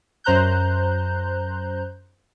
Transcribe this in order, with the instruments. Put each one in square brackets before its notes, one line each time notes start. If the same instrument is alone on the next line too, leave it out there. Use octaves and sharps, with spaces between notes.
[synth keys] F#2 C5 A#5 F#6 G6